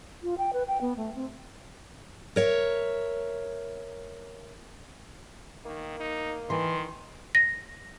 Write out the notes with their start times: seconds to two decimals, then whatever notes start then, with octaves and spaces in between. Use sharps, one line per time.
0.23 F4
0.38 G5
0.53 B4
0.68 G5
0.81 B3
0.97 A3
1.16 C4
2.36 A#4 C#5 E5
5.65 D#3 A#3
6.00 D#4
6.50 D#3 E3 C6
7.35 A#6